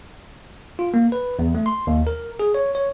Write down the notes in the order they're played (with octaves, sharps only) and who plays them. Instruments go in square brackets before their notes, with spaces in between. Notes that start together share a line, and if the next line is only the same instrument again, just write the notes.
[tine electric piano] F4
A#3
B4
E2
A3
C6
D#2
A#4
G#4
C#5
C#5